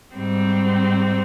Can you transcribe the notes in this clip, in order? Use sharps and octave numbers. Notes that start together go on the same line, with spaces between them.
G#2 G3 C4